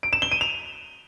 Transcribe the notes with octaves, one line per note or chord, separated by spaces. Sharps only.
D7
E7
G7
D#7
F7